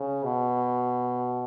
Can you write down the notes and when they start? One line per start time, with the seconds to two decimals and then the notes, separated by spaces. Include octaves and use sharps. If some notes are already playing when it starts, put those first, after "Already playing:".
Already playing: C#3
0.24 B2